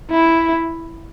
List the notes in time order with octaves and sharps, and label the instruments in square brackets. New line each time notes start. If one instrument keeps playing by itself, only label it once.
[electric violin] E4